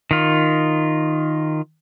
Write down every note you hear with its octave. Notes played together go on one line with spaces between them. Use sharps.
D#3 F4